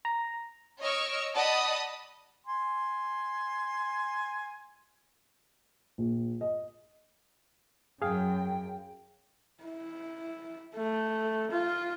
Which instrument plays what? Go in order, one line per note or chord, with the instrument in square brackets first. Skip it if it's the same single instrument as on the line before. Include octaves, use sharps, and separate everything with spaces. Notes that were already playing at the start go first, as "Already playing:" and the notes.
[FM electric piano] A#5
[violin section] C#5 D#5 C#6 E6 F6 D7
D5 D#5 F#5 A5 B5 D#6
[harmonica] G#5 C6
[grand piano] A#1
D#5
[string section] F#2 [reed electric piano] G#4 F5 [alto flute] G5
[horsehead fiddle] E4
A3
F4